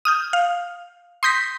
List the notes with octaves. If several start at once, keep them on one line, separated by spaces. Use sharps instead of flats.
D#6 F6 G6
F5
C6 D#6 G6 A#6 B6